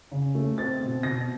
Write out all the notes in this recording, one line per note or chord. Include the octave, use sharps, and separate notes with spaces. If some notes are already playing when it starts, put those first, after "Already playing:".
C#3
A3
C4 A6
B2
B2 A#6